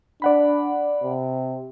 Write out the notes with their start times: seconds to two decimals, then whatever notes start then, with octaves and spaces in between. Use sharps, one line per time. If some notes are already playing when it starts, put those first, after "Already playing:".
0.22 D4 D5 F#5 B5
1.03 C3